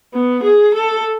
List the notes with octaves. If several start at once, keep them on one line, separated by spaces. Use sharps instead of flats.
B3
G#4
A4